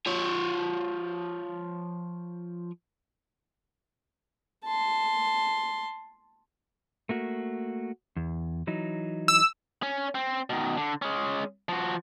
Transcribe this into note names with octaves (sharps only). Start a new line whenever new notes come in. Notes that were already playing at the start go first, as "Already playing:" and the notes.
F3 C#5
A5 C6
A3 A#3 F#4
E2
E3 F#3 D#4
E6
C#4
C4
B2 D#3
D3
G#3 C#4
F3 F#4